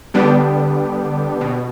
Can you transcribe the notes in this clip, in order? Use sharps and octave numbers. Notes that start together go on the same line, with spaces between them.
D3 G3 B3 D4 G4
B2